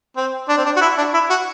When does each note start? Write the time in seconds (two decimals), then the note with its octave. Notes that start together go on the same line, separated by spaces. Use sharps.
0.17 C4
0.49 D4
0.57 C4
0.65 D4
0.76 F#4
0.82 E4
0.98 D4
1.14 E4
1.30 F#4